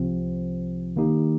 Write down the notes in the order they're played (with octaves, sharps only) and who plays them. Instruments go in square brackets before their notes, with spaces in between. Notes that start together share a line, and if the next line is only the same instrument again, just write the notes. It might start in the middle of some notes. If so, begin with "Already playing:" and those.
Already playing: [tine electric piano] C2 C3 F3 C4
D#3 A#3 D#4 G4